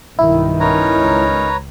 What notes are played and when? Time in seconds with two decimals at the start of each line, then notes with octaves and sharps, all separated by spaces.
0.19 B1 G2 D#3 E4
0.60 C#4 D#4 A#4 B4 C#5 A#5
0.97 C#2